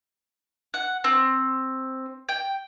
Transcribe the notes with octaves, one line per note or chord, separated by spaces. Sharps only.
F#5
C4
G5